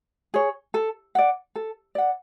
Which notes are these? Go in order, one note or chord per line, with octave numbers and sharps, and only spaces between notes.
G#4 C#5
A4
D5 F#5
A4
D5 F#5